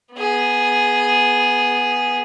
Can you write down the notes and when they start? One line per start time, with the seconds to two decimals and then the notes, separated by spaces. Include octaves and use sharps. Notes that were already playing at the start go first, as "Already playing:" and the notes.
0.14 B3 G#4